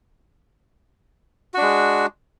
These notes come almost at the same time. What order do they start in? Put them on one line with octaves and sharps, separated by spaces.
F#4 D4 G#3